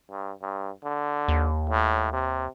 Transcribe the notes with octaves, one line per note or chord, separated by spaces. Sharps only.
G2
G2
D3
D#2
A2
C3